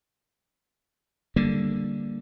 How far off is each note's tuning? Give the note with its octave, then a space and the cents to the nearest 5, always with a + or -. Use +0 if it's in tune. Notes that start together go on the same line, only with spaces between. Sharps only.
D3 +0 G3 +0 A#3 +0